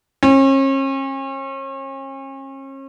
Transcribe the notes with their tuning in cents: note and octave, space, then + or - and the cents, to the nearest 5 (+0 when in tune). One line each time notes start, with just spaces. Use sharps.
C#4 -40